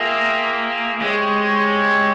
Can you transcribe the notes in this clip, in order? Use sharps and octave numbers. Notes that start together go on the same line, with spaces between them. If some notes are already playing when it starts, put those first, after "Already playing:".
Already playing: A#3 F4 G#4 E5 G5
G#3 C4 G4 C#5